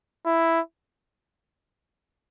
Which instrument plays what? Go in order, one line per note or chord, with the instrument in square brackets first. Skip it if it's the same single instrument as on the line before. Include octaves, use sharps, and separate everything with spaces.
[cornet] E4